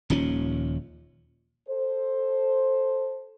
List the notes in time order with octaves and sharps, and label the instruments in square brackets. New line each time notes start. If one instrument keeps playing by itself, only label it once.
[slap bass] D#1 D#2 F3 C#4
[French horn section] A4 C5